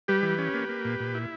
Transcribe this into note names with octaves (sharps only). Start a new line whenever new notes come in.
G3 G4 B4
E3
C#4
A#3
A#3
A#2
A#2
E4